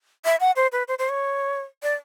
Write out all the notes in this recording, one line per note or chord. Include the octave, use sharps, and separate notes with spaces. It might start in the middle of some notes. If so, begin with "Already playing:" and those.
E5
F#5
C5
B4
C5
C5
C#5
D5